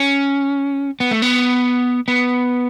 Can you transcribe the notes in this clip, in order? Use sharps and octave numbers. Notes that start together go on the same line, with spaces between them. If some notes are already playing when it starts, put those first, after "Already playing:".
Already playing: C#4
B3
A3
B3
B3